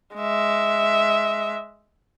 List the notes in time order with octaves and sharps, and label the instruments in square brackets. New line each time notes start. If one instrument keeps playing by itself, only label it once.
[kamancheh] G#3 E5